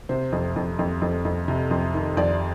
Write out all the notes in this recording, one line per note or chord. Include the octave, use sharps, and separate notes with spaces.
C3 C5
F2
F2
F2
F2
F2
C3
F2
D#3
F2 D5